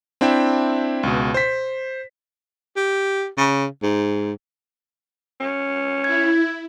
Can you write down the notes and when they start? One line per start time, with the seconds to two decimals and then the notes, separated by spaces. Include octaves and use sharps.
0.21 C4 D4 E4 E5 G5
1.03 C#2 B2
1.34 C5 B6
2.76 G4
3.38 C#3
3.83 G#2
5.40 C#4
6.04 E4 G#6